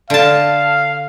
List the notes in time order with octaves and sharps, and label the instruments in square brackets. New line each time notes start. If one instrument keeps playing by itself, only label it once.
[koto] D3 A5 [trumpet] F5